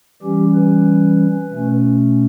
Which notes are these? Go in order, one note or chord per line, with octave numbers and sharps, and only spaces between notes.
E3 G3 C#4 G4
B4
B2 A3 C#4